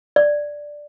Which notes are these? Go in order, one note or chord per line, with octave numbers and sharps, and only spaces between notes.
D5